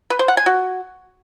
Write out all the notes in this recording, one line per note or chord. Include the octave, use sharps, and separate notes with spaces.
B4
C5
F#5
G#5
F#4